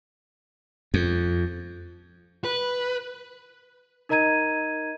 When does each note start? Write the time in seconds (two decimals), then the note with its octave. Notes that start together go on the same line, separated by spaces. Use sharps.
0.94 F2
2.45 B4
4.09 D#4 A#4 D#5 A#5 G#6 D#7